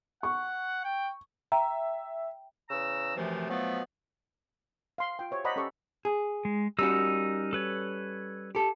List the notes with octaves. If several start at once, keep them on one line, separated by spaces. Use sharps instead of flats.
F#5 C#6
G5
E5 G5 A#5
E2 C#3 A#5 E6
F#2 C3 E3 F3 A3
B2 F3 F#3 A3 B3
F5 C6
F4 G5
G4 C5 C#5 E5
C5 D5 D#5 F#5 A#5 B5
C#4 G4 A4 D5 C#6
G#4
G#3
G3 C#4 D#4 F#4 A#4 E6
A4 B4 C#5
G4 A4